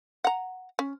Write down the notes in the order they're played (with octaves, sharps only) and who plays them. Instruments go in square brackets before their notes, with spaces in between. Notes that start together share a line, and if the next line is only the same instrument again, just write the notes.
[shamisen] F#5 A#5
C#4